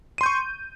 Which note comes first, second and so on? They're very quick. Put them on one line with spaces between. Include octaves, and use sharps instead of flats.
D#7 C6 G6 C#6